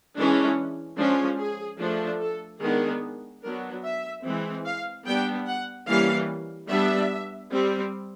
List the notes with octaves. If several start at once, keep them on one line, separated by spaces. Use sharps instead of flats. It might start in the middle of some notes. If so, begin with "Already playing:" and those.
E3 G#3 C#4 D4
F3 G#3 C#4 D4
G#4
F3 A3 D4
A4
D#3 G#3 B3 D4 G#4
F#3 B3 D4 A#4
E5
E3 G#3 C4
F5
G3 B3 D4 G5
F#5
E3 G3 A#3 C#4 F5
G3 B3 D4 E5
G3 C4